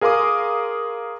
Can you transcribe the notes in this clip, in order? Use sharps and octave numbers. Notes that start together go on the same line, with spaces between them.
G#4 A#4 F5 C6 D6 D#6